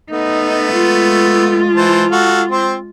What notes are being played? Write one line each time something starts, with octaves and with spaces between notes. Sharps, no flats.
A3 B3 D#4
G#3 F4
E3 C5 A5
F#4 A4 F5
C4 C5